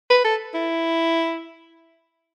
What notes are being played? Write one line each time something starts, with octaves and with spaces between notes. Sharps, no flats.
B4
A4
E4